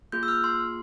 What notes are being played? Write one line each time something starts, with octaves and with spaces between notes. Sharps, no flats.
A#3 F4 G#4 G6
E6
F6
C6